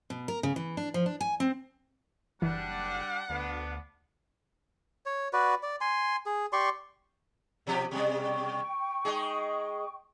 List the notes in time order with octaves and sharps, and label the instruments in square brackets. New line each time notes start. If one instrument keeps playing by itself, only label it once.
[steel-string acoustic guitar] B2
A#4
C#3
E3
D4
F3
D4
G#5
C4
[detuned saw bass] F#1 [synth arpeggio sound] E3 [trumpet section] G3 D4 [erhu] F#5
[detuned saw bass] D2 [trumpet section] B3 D4
[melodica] C#5
F#4 B4 D5
D5
G#5 C6
G#4
G4 D5 C6 C#6
[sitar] B2 F3 G4
[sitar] B2 G3 [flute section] G5 C#6
[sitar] G#3 D#4 G#4